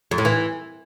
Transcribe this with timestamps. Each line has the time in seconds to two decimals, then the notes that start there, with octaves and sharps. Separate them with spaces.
0.11 F2
0.18 A2
0.25 E3